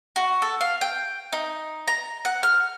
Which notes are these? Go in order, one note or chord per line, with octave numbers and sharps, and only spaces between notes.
F#4
A4
F5
G5
D#4
A#5
F#5
F6